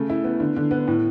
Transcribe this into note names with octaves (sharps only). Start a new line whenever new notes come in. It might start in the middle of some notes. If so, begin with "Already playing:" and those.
Already playing: C#3 A3
E4
B3
D3
D3
B3
A2